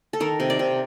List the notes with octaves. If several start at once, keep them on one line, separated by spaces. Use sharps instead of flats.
A4
D#3 A#4
C3
D5
C3